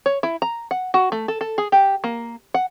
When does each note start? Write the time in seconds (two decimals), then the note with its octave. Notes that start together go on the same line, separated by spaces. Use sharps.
0.06 C#5
0.23 E4
0.42 A#5
0.71 F#5
0.94 F#4
1.12 A3
1.28 A4
1.41 A4
1.58 G#4
1.72 G4
2.04 A#3
2.54 F#5